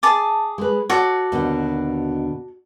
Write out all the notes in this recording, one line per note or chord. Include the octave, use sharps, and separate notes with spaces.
G#4 A5 D6
G#3 B4
F#4 A4 C#5 D5
D#2 B2 D3